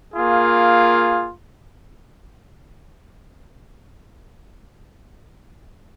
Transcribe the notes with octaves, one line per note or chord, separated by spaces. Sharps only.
A#3 F4 G#4